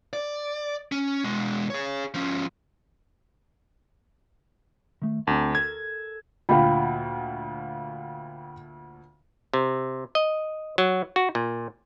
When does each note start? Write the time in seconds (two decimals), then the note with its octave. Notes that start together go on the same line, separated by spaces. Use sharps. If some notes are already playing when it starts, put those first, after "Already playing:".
0.13 D5
0.92 C#4
1.24 B2 G#3
1.70 G#4 C#5
2.14 F3 C#4
5.02 D#3 A3
5.27 D2 C4 A5
5.55 A4 A#4 G#6
6.49 D2 A#2 F5 G5 B5
9.54 C3
10.15 D#5
10.78 F#3
11.16 F#4
11.35 A#2